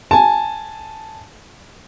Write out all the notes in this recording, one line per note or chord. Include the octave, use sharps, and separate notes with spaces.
G#5 A5